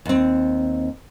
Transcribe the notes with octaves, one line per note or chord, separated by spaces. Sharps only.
D#2 C4